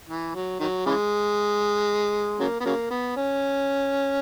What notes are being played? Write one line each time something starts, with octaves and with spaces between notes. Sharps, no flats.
E3
F#3
D#3 F#3
C#3 E3 G#3
C#3 F#3 A#3
B3
C#3 F#3 A#3
B3
C#4